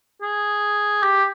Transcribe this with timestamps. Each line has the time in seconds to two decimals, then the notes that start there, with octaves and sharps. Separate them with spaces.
0.22 G#4
1.03 G4